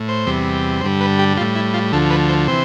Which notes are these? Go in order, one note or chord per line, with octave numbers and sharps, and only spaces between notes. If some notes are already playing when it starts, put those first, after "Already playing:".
Already playing: A2
C5
E2 C3 G3
G2 D3 G3 C5
B4
G4
A2 G3 F4
E4
F4
D2 D3 F3 A4
B4
C5
C3 E3 C5